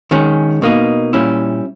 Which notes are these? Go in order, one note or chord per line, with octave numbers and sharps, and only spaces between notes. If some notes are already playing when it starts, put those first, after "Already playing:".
D#3 G#3 C#4
B2 A#3 D#4
A#2 G3 C#4 E4